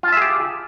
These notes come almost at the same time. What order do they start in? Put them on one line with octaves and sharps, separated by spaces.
F4 A5 E5 G#4 G4